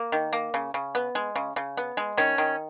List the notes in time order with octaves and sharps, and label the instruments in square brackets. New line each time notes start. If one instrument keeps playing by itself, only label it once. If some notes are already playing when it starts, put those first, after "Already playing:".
Already playing: [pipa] A#3
D#3
A#3
C#3
C#3
B3
G#3
C#3
C#3
B3
G#3
D#3 C#4
D#3